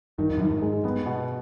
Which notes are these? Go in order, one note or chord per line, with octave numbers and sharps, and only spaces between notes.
G2 D#3
F2
F#2
G2 D#3
G#2
G#3
G2 B3
B2